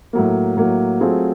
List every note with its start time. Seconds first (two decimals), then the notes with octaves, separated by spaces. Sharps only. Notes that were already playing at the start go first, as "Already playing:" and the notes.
0.13 A2 F#3 A#3
0.57 A2 F#3 A#3
1.01 F#3 A3 C4 F4 G#4